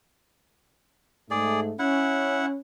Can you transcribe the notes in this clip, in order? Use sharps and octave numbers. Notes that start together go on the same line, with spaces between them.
G#2 A3 G#4 D5
C#4 E4 F#5